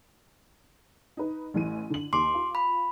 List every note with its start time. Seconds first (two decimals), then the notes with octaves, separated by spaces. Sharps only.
1.17 D#4 B4
1.54 A1 E3 D#7
1.90 D3 F#7
2.13 D#2 C6 D6
2.34 F4
2.55 B5